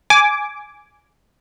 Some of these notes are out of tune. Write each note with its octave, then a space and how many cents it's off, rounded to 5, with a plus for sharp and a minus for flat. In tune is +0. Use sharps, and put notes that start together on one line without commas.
G#5 +0 D6 -10